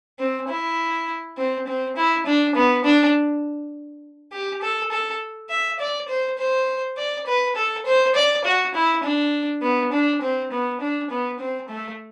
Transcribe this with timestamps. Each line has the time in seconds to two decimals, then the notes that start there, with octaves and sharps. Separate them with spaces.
0.19 C4
0.49 E4
1.37 C4
1.67 C4
1.96 E4
2.26 D4
2.55 B3
2.85 D4
4.32 G4
4.62 A4
4.91 A4
5.50 E5
5.80 D5
6.09 C5
6.38 C5
6.97 D5
7.27 B4
7.56 A4
7.86 C5
8.15 D5
8.45 F#4
8.74 E4
9.04 D4
9.62 B3
9.93 D4
10.22 C4
10.51 B3
10.81 D4
11.10 B3
11.39 C4
11.69 A3